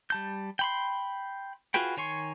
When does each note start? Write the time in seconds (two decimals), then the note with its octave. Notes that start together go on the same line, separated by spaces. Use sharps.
0.10 G3 A5 G6
0.59 G5 B5 C6
1.74 F4 F#4 G#4 B4 G5
1.97 D#3 C#5 G#5 C6 C#6